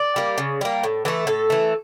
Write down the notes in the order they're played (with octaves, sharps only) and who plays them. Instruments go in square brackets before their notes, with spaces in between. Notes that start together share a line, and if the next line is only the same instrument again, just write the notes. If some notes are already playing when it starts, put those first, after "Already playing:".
Already playing: [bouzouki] D5
G3 A#3
C#3
G3 A#3
A2
E3 A3 A4
A2 A4
E3 A3